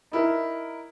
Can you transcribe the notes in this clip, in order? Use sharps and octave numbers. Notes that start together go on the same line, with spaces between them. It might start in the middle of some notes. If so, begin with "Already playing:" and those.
D#4 E4 A#4